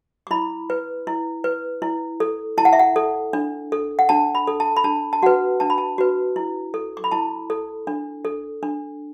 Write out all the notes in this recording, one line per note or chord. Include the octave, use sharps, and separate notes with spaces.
D6
E4 B5
B4
E4
B4
E4
A4
E4 A5
F#5
E5
F#5
A4
D4
A4
F#5
D4 A5
B5
A4
A5
B5
D4 A5
A5
F#4 B4 F#5
D4 A5
B5
A5
F#4 B4
E4
A4
D6
B5
E4 A5
A4
D4
A4
D4